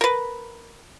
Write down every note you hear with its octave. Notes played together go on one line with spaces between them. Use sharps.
A#4 B4